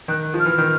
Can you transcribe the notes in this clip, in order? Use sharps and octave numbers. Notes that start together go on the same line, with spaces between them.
D#3 F#6
F3
F6
E3
D#3